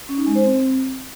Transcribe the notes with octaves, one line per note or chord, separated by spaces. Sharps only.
C#4
D#4
G#3
C5
C4